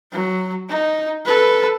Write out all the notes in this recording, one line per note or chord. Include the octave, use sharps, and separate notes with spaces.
F#3
D#4
A4 B4